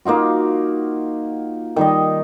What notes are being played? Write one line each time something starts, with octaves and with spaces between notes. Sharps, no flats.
A#3 D#4 F4 F#4
D#3 G3 D#5